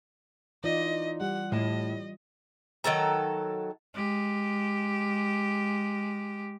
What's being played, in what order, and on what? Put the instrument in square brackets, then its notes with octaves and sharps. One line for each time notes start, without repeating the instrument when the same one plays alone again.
[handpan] E3 F4 D5 [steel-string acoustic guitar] D#4 [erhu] D#5
[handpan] G3 [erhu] F#5
[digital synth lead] A2 [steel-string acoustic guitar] A3 A5 [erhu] D#5
[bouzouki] D#3 F#3 A4 A#5
[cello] G#3 G4